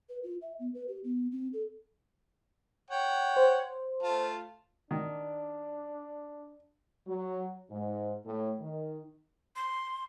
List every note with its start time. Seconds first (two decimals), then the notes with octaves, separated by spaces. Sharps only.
0.09 B4
0.23 F4
0.42 E5
0.59 B3
0.74 B4
0.88 G4
1.04 B3
1.31 C4
1.53 A4
2.91 C#5 F#5 G5
3.36 C5
4.03 A3 F4 A5
4.91 D#3 D4
7.07 F#3
7.70 G#2
8.26 A2
8.60 D#3
9.56 C6